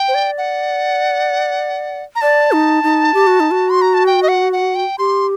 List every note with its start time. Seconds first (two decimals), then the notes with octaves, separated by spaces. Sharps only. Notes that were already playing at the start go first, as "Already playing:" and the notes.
Already playing: G5
0.08 C5
0.15 D5
0.38 F#5
2.15 A#5
2.21 D5 A5
2.52 D#4
2.84 D#4
3.14 G4
3.27 F#4
3.40 D#4
3.52 F#4
3.70 C6
3.82 A#5
3.94 A5
4.06 G5
4.23 D#5
4.28 F#5
4.53 F#5
4.75 G5
4.98 G4 C6